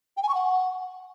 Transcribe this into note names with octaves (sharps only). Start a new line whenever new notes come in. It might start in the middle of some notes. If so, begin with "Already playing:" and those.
G5
G#5
C#6
F#5